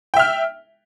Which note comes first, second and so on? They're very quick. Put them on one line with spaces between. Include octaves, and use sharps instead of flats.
G5 E5 F6